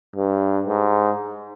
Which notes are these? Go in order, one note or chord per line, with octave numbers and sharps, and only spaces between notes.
G2
G#2